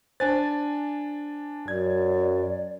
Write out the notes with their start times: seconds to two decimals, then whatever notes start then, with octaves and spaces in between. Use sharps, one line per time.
0.20 D4 C5 G#5 A6
1.68 F#2 D5 G#6